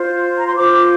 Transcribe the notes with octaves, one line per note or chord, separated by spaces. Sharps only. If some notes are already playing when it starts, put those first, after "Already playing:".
Already playing: F4 C5
A#5
C6
F4 C5 D6